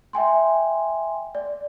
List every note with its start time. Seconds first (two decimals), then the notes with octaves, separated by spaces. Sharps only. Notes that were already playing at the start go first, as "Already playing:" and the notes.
0.13 E5 G5 G#5 C6
1.35 D5